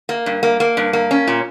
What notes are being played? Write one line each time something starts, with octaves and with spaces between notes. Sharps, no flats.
A#3
G2
A#3
A#3
G2
A#3
C#4
A#2